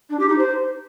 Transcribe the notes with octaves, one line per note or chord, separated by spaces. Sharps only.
D4
G4
D#4
C5